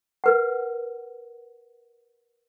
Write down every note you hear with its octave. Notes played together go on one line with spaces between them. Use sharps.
A#4 B4 F#5